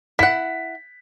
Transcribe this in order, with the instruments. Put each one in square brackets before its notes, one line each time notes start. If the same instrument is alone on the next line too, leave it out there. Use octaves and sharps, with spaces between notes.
[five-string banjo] E4 F#5 [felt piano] B6